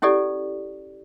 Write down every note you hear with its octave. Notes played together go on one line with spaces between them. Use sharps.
C#4 E4 G4 A4 D5